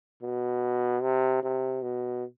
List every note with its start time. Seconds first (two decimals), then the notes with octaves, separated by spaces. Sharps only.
0.23 B2
1.02 C3
1.43 C3
1.83 B2